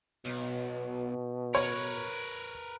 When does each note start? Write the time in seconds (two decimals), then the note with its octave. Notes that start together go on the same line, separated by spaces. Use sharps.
0.25 B1 B2
1.55 A#4 B4 C#5